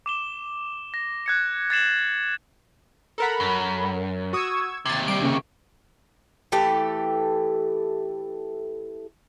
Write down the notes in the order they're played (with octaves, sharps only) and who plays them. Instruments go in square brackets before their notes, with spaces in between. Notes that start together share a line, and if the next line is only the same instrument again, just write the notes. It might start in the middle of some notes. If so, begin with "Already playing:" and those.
[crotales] D6 E7 G7
A#6
F#6 G#6 C#7
G#6 A6 C7 E7 F#7
[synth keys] A4 A#4 F#5 [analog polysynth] A#5 B5
[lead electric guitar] F#2
[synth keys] F#4 D#6 [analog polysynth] C#6 E6 G#6
[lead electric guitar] D#2 C3 [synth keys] G#6 A6
[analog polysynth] G3 C7 [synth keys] D7
[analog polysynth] C#3 A#3 C#6
[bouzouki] E3 A3 G4 A4